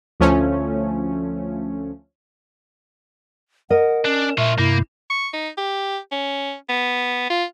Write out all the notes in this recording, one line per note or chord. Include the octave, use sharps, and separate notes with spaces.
D2 F3 A3 C#4
A#4 D#5 F#5
C#4 D4
A#2 F4 C#5 E5
G2 C3 A#3 E4
C#6
D#4
G4
C#4
B3
F4